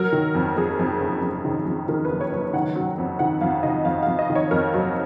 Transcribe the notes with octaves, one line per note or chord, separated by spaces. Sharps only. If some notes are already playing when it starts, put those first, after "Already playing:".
Already playing: F#3 A#4
D#3
F2
F2 G#4
F2
F#1
F2
D#3
F2
D#3 A#4
B4
F#1
C#5
F#1
B4
D#3 F#5
F#3
F2
D#3 F#5
F2 F5
D#3 D#5
F2 F5
F2 F5
D#5
D#3
C#5
F2 A#4
F#3